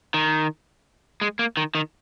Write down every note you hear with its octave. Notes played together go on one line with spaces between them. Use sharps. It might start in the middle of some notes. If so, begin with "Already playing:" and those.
D#3
G#3
A#3
D#3
D#3